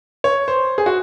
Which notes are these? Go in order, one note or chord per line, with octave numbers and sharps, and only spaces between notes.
C#5
C5
G#4
F#4